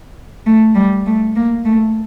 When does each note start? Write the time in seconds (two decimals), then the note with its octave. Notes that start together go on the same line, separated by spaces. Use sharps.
0.46 A3
0.75 G3
1.06 A3
1.36 A#3
1.65 A3